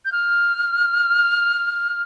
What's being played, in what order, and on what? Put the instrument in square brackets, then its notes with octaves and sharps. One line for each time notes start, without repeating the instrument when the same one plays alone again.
[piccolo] G6
F6